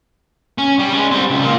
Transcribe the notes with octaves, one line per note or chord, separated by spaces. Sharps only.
C#4
G3
G#3 C#4
G3 C4
C#2
A#3 F4